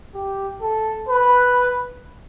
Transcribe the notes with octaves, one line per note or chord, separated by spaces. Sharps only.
G4
A4
B4